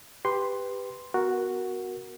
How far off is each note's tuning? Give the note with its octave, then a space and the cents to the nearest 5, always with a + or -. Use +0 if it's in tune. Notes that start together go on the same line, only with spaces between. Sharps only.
G4 +10 B4 +5 C6 +0
B3 +0 F#4 +0 A#4 +5